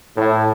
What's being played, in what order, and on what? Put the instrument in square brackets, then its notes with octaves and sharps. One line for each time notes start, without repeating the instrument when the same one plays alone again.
[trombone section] A2